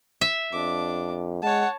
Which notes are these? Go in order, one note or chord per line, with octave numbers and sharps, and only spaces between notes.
E5
F2 D4 D6
G#3 C#5 F#5 A5